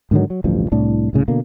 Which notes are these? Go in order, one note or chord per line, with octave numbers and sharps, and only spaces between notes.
G#2 D3 D#3 F#3
F#3
A1 D2 G2 F3
C2 A2 D4
C2 A2 C#3
B2 D3 A#3